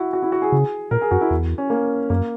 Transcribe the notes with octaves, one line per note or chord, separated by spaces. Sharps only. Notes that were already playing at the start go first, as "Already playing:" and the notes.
Already playing: E4 F#4
F#4
E4
F#4
G#4
C#3
A#2 A#4
G#4
F#2 F#4
E4
E2
C#4
A#3
F#2 A#3